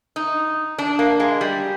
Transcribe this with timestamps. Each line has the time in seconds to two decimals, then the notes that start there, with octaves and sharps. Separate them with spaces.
0.16 D#4
0.78 D4
0.99 A#3
1.20 G#3
1.41 G3